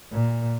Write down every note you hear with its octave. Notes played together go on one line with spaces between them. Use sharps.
A#2